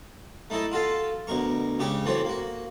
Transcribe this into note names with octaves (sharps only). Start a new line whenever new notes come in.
A3 D#4 E4 A4 D#5
F4 F#4 A4 F5
D2 B2 A#4 C#6
C#2 C#3 C#4 G4 C#6 D6
E3 A3 C4 F#4 C5 C#5
A#3 F#4